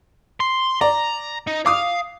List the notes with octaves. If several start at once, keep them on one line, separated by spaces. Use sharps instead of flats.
C6
D5 A#5
D#4
F5 D6 D#6